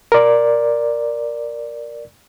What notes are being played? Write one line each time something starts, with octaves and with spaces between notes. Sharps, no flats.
A#4 D5